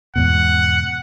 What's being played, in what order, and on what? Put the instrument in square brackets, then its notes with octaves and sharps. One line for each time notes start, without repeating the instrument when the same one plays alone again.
[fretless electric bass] E2 G#2 B2 [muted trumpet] F#5